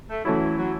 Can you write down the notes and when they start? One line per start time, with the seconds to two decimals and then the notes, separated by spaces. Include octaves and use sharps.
0.09 A3
0.25 E3 F#3 A3 C#4 E4
0.57 F#3